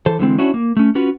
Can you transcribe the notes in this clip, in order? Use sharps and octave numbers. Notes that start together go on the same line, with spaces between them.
E3 A4 C5
D3 E3 G#3 C4
C#4 D4 E4 F#4 C#5
A#3
A3 C#4
C#4 F4 F#4 B4